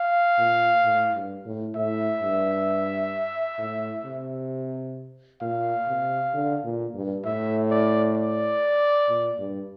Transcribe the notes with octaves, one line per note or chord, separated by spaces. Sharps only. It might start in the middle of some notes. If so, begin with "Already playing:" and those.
Already playing: F5
A#2
A2
G2
A2
A2 E5
G2
A2
C3
A#2 F5
C3
D3
A#2
G2
A2 E5
D5
D5
A#2
G2